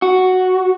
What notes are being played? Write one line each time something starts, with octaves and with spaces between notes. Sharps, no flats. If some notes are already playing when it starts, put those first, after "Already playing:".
F#4